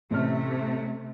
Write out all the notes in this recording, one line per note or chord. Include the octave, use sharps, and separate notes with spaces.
A1 C3 A3 F6